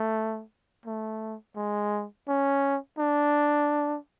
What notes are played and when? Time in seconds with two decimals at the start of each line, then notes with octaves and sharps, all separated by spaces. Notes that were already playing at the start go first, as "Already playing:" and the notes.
Already playing: A3
0.86 A3
1.56 G#3
2.28 C#4
2.98 D4